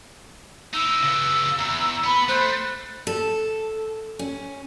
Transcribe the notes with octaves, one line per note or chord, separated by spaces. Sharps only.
D#4 E4 E6
C#3 B3
E2 A#5
B3 B5
A3 C5 F#6
A4
C#4